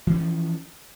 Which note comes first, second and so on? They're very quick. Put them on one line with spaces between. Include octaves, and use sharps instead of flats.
E3 C#4 F3